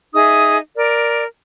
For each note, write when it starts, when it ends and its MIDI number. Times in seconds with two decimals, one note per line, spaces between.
0.14 0.57 63
0.14 0.57 68
0.14 0.57 76
0.14 0.57 87
0.75 1.25 70
0.75 1.25 74